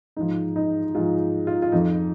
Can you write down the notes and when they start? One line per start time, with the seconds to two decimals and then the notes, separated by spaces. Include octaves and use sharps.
0.17 G#2 F3 D#4
0.56 D#4
0.95 G#2 F3 F4
1.47 F4
1.62 F4
1.72 F2 F3 D#4